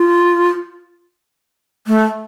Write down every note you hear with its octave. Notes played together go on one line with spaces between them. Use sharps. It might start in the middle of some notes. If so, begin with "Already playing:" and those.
Already playing: F4
A3